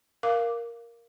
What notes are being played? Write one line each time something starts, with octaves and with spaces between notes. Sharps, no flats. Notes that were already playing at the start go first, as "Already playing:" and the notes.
A#4 F5 D6